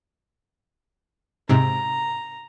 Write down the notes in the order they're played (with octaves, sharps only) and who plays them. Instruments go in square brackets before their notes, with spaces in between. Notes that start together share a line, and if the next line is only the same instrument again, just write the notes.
[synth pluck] G#2 C3 [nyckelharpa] A#5